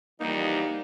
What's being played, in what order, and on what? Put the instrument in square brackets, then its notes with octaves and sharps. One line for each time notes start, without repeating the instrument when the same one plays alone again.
[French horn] E2 [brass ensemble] E3 F3 G3 [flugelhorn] A#3 [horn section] D#4